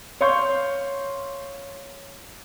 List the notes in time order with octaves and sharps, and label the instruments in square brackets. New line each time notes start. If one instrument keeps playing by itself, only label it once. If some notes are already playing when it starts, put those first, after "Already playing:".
[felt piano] C#5 F5 C6 C#6 G6